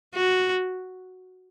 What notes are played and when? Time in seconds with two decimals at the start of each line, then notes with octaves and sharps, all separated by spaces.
0.15 F#4